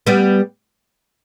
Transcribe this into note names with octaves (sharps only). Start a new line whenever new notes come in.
G3 B3